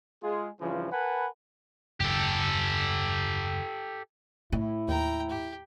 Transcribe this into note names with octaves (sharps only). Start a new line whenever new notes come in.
G#3 F4 G#4
G2 C#3 E3 F3
A#4 B4 F#5 G#5 A5 B5
F#1 D#2 G#2 G4 A4
A2 E4
D#2 G5 A#5
G4